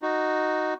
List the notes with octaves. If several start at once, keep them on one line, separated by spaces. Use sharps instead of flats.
D#4 F#4